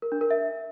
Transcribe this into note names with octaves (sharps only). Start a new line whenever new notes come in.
A#4
D4
A#4
E5